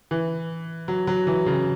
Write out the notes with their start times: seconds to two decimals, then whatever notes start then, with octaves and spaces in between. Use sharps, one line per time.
0.11 E3
0.88 F#3
1.07 F#3
1.27 E3
1.46 C#3